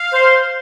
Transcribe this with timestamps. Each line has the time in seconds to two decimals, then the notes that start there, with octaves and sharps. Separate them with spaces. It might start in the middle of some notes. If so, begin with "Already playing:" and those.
Already playing: F5
0.12 C5